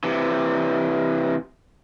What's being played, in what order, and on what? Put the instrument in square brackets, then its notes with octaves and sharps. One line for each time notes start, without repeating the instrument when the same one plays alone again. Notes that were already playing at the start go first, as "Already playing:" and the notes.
[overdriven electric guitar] C3 E3